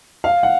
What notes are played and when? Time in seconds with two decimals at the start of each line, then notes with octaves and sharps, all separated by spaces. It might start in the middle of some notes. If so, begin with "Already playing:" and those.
0.24 F5
0.43 F#5